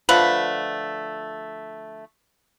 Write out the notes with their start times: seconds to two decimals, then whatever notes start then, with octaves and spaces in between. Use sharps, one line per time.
0.09 D3 F3 A3 B4